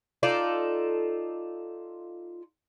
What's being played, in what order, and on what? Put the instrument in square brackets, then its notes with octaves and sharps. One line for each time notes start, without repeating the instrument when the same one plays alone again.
[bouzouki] D#4 F4 A4 D5